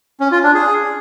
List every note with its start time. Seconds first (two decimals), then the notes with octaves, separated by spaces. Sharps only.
0.20 C#4
0.32 F4
0.43 D4
0.55 G#4